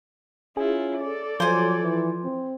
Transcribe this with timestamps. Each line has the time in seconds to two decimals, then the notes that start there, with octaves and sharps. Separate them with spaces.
0.57 C#4 E4 F4 G#4
1.00 A4 D5
1.40 F3 F#3 C5 G#5
1.81 E3
2.24 C4